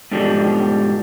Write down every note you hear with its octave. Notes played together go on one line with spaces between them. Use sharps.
G#2 B2 D3 F3 G3